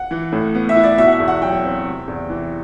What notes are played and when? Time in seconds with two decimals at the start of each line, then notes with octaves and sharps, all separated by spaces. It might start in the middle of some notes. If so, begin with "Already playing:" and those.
Already playing: F#5
0.11 E3
0.32 A2
0.55 B3
0.69 E5
0.76 E4
0.83 D5
0.98 B2 E5
1.06 F#5
1.12 E5
1.20 E2
1.28 F#5
1.42 F#3 G5
1.64 C4
1.86 C3
2.08 E2
2.29 E3